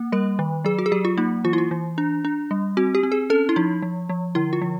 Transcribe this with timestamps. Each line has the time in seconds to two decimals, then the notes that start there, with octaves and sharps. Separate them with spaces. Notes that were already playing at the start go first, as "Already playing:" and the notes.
Already playing: A#3
0.12 G3 A#4
0.39 D#3
0.65 F#3 G#4
0.79 F#4
0.86 G#4
0.92 F#3 G4
1.05 F4
1.17 A#3 D#4
1.44 E3 F4
1.53 E4
1.58 F4
1.71 E3
1.98 D4
2.25 D4
2.51 G3
2.77 C4 F#4
2.95 G4
3.03 C4
3.12 G#4
3.30 C#4 A4
3.49 E4
3.56 F3 D#4
3.82 F3
4.09 F3
4.35 D3 E4
4.53 F4
4.62 F3